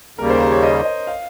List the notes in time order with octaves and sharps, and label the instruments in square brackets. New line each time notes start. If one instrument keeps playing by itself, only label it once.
[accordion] D#2 C#3 G3 A#3 [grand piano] A#4
[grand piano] C5
C5
C#5
D#5
D#5
F5